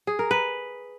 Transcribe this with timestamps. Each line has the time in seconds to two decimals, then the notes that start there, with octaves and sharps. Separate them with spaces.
0.07 G#4
0.19 A#4
0.31 B4